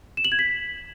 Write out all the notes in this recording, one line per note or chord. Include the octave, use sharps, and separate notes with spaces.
E7
F#7
G#6
B6